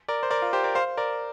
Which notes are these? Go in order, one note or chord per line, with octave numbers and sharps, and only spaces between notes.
A#4 D5
C5
A#4 D5
F4
G4 C5
A#4 D5
C5 F5
A#4 D5